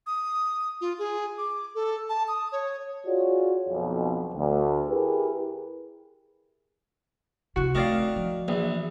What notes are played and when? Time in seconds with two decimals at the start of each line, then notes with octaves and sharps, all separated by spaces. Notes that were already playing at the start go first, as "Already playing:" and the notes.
0.07 D#6
0.81 F4
0.99 G#4
1.38 D6
1.75 A4
2.09 A5
2.28 D#6
2.52 C#5
3.06 F4 F#4 G#4 C#5 D5
3.68 B1 F2
4.34 D2
4.88 E4 G4 G#4 A#4 B4
7.56 C3 E4 F#4
7.75 D#3 A3 C4 A#4 D5 F5
8.16 F3
8.48 A#1 E3